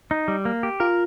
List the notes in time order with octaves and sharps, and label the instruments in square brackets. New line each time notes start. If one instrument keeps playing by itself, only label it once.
[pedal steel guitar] D#4
G3
A#3
G4
[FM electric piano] F4 [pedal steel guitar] A#4